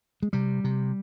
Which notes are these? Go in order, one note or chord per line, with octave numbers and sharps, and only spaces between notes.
G#3
C3 G3
C3